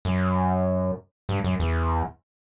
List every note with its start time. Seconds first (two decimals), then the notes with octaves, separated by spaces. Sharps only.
0.05 F#2
1.29 G2
1.44 F#2
1.60 E2